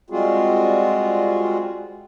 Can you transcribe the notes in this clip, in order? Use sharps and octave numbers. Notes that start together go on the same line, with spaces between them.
G3 G#3 C4 F4 F#4 G#4